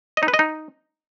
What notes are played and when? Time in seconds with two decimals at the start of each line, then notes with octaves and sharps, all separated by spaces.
0.17 D#5
0.23 D#4
0.28 B4
0.34 D#5
0.39 D#4